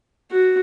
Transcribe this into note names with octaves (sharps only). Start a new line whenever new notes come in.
F#4